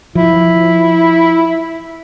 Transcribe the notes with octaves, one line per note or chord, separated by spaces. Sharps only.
F3 E4